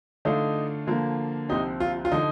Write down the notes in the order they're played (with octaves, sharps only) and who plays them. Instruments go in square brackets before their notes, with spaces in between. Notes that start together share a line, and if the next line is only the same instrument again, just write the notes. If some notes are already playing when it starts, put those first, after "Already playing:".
[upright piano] D3 A3 D4 F4 A4 [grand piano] D#4
[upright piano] D3 F3 A#3 F4
[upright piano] C2 C3 F3 C4 [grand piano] D#4
[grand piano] F4
F4
[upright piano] D3 F3 [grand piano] D#4